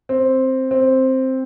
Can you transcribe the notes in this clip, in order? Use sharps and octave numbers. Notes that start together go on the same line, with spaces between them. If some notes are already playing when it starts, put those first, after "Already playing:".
C4
C4